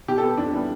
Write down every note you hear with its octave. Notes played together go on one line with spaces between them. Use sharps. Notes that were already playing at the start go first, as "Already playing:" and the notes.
B2 G4
A4
B3
F2 D4
E3 G3 B3